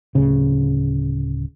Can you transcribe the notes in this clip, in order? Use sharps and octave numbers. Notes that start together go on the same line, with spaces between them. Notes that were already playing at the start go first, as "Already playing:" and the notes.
D1 C#3